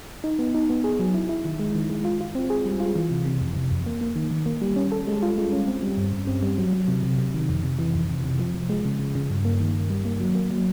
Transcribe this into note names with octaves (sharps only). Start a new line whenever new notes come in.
D#4
B3
D#4
B3
G#4
F#3
E4
E4
D#3
G#3
D#3
G#3
F4
F4
C4
G#4
G3
F4
E3
C3
C3
F2
C3
F2
A#3
A#3
D#3
D#3
A#3
G3
C#4
A4
G#3
F4
G#3
C#4
C4
G3
G2
G2
C4
G3
F#3
F#3
C3
C3
C3
D#3
F2
C3
E3
F2
C3
C3
F3
F3
G#3
C#3
C#3
C#3
G2
A#3
D#3
G2
G3
A#3
F#3
A#3
F#3